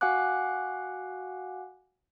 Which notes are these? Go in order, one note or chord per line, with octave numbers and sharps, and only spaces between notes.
F#4 F5 F#5 G#5 D6 F#6